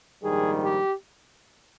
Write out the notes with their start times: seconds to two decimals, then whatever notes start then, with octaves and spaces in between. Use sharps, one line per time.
0.23 A#1 G#2 D#3 G3 G#4
0.64 G4